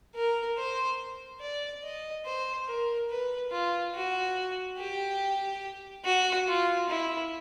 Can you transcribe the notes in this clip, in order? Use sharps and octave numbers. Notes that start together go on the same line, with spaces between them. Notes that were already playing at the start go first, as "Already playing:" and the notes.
A#4
C5
D5
D#5
C5
A#4
B4
F4
F#4
G4
F#4
F4
E4